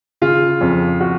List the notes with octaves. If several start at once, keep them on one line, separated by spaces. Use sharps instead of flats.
C#3 F4
F2
F#4